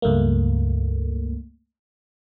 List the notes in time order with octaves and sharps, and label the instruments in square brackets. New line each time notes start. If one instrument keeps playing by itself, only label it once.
[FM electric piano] C#2 G2 A3 A#3